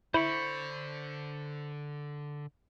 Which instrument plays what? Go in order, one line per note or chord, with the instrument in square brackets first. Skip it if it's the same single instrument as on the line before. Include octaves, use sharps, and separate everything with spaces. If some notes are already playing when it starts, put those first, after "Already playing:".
[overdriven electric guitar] D3 [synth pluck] E4 [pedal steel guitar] C5 B5 C#6